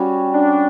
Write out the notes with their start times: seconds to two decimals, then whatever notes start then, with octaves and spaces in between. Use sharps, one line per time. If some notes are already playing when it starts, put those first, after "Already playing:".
Already playing: G3 C#4 F#4
0.34 D4